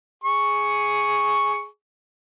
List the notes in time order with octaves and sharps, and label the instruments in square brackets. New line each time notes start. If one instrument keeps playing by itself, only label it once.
[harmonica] G#4 C#6